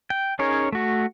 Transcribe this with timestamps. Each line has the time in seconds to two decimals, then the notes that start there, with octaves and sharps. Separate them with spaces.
0.10 G5
0.39 C#4 D#4 G#4 A#4 C#5
0.72 A3 F#4